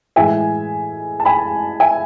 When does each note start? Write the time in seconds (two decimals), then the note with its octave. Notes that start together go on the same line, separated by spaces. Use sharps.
0.16 A2 E3 G#3 E5 G#5
1.20 A5
1.25 G#5 B5
1.80 E5 G#5